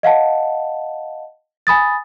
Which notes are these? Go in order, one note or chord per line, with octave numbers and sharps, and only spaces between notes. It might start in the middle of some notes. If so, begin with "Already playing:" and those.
D#5 F5 F#5 A5
G#5 B5 D#6 A6